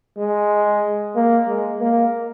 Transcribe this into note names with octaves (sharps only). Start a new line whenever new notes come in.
G#3
A#3
G#3
A#3